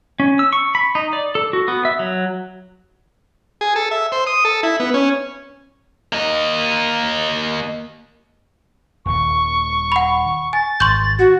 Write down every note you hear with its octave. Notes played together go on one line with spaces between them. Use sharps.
C#4
E6
C#6
B5
D#4
D5
A4
F#4
B3
E5
F#3
G#4
A4
E5
C5
D#6
A4
E4
B3
C#4
A#3 D#5
D#1 D#2 C#6
F#5 B5
G#5 A6
G#1 C6 C#6 G6
F#4